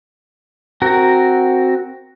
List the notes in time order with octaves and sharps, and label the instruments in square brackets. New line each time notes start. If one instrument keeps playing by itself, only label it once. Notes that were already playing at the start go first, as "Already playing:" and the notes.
[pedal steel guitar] C4 F#4 A#4